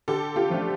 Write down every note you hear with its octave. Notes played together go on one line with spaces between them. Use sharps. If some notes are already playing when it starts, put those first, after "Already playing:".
D3 G4 A4
F4 G4
F3 A3 D4